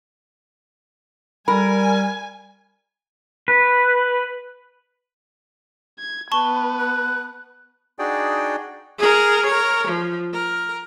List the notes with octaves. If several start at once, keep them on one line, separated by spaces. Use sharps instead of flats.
G3 A#4 G#5 B5
B4
G#6
B3 B4 A5 C#6 G7
F#6
D4 D#4 F#4 G#4 D5 G5
G#4 A#4
A#4 C#5
F3
A#4